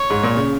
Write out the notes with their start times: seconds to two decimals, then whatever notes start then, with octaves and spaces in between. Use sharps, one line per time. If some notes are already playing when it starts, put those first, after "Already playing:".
Already playing: C#5
0.10 G#2
0.23 A#2
0.37 C#3